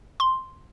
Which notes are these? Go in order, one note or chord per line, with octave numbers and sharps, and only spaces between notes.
C6